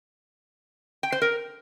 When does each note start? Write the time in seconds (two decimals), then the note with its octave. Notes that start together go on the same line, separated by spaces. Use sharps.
1.03 G5
1.12 C5
1.22 A#4